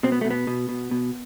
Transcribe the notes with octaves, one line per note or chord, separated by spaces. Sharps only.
B2 C4
B3
B2 A3
B3
B2
B2
B2